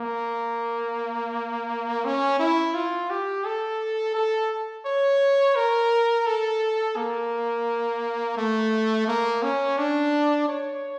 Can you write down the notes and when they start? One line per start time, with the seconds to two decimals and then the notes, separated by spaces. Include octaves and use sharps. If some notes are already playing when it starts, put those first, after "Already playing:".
Already playing: A#3
2.05 C#4
2.39 E4
2.74 F4
3.10 G4
3.45 A4
4.15 A4
4.85 C#5
5.56 A#4
6.26 A4
6.96 A#3
8.37 A3
9.07 A#3
9.43 C#4
9.78 D4
10.48 C#5